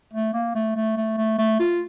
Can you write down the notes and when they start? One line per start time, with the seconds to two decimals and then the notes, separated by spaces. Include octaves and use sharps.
0.13 A3
0.33 A#3
0.55 A3
0.76 A3
0.97 A3
1.18 A3
1.39 A3
1.60 F4